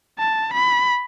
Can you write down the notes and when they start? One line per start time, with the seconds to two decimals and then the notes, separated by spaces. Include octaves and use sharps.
0.19 A5
0.54 B5